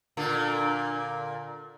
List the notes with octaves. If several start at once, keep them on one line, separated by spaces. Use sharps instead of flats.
A#2 D3 A#3